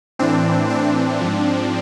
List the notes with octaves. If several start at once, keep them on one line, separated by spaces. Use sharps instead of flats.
A2 E3 C4 D4
C4 D4
G#2 F3